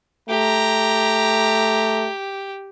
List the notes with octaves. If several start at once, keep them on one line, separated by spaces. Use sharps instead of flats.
A3 G4 A#5